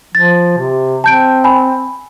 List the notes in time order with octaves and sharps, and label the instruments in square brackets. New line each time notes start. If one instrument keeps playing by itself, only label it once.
[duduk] F3 [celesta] A6
[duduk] C3
[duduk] C4 [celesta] A5 G6 D7
[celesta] G#5 B5